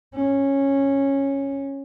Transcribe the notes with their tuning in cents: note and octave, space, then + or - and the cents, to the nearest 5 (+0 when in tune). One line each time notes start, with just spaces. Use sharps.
C#4 -10